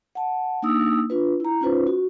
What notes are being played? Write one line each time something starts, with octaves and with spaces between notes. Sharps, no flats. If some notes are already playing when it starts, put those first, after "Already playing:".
F#5 A5
A#3 D4 D#4 D#6 E6
D4 F4 B4
E4 A#5
C#4 D#4 F4 B4 C5
F#4